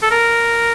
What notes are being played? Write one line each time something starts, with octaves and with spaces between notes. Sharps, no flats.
A4
A#4